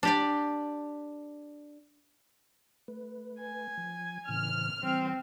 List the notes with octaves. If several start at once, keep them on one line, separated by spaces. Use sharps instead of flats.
D4 G4 D5
A3 B4
G#5
F3
A2 C#3 E3 F6
E3 G3 C4